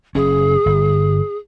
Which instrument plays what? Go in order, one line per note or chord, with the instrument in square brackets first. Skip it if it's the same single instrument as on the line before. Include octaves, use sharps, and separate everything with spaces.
[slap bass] F#1 C#4 [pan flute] G#4
[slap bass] G1